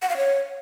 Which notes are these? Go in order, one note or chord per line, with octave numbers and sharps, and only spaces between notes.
F#5
F5
C#5